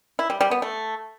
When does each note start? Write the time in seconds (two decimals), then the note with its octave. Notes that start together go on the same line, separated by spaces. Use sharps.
0.19 E4
0.30 G3
0.41 G3
0.51 B3
0.62 A3